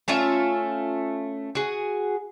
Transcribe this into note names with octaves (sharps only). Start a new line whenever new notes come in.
A3 C#4 F4 E5
F#4 G#4